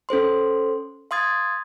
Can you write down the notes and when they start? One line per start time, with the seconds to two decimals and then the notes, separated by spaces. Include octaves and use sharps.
0.09 C#4 A4 C5 C6
1.11 F5 C6 D#6 G#6 A6